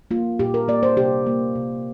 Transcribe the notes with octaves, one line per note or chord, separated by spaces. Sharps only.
A#3 F4
A#2 G4
A#4
A#3 D5
C5
C3 G4
A#3
C3